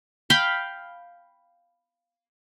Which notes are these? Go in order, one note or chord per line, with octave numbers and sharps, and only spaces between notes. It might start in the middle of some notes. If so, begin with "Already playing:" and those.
F5 G5 B5